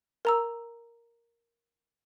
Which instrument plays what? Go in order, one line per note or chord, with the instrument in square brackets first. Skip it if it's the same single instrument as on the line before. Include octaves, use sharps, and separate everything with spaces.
[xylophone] A#4 A#5 E6